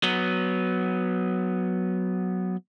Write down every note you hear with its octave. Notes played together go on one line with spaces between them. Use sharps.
F#3 B3